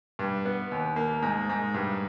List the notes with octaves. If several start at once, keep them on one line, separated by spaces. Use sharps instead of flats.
G2
B3
D#2
A#3
G#2
G#2
G2